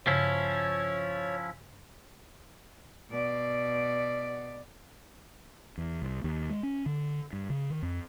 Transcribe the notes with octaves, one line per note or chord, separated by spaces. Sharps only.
G2 C#3 F3 C#4 E4 C#5
B2 D5
E2
C2
D#2
G#3
C#4
D3
G2
C#3
D#3
F2